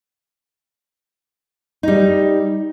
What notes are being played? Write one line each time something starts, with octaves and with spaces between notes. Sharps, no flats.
G3 D#4